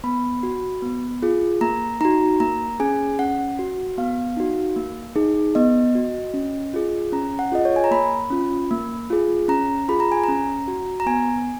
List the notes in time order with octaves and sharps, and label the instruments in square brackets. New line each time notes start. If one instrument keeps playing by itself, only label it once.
[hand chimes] B3 B5
F#4
B3
F4 G#4
A#3 A#5
D#4 F#4 A#5
A#3 A#5
C#4 G#4 G#5
C#4 F#5
F#4
B3 F5
D#4 F#4
A#3
D#4 G#4
B3 D#5
F#4
C#4
F4 G#4
C#4 A#5
F#5
F4 G#4 D#5
C#5
G#5
A#5
A#3 B5
C#4 F4
A#3
F4 G#4
C#4 A#5
F4 G#4 B5
A#5
G#5
C#4 A#5
F#4
A#5
B3 G#5